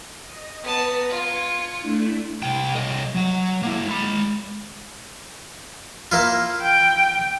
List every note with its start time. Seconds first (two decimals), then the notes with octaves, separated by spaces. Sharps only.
0.23 D#5
0.63 B3 B4 A5 A#5
1.09 F4 G#6 C#7
1.80 A3 D4 E4
2.43 C2 G5
2.76 C2 D#5
3.15 F#3 F#5
3.63 A#3 E4
3.88 G#3 B5
6.12 A#3 E4 F4
6.61 G5